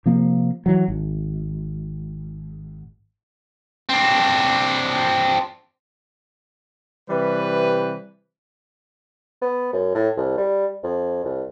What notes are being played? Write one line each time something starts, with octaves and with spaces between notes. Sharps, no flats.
C3 F3 A#3
E3 F#3
G#1
C4 D4
C3 E3 G3 B4
B3
F#2
A2
C2
G3
F2
C2